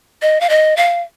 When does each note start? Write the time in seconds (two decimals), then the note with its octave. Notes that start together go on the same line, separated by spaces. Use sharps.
0.22 D#5
0.41 F5
0.50 D#5
0.77 F5